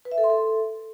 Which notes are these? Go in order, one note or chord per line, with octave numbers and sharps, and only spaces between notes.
B4
E5
A4
C6
A4